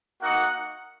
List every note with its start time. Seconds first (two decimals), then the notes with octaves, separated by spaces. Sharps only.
0.21 A#3 D#4 F#4 F#5